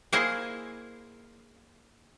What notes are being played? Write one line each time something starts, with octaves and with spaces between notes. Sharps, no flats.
A#3 E4 G#4 C5 D#5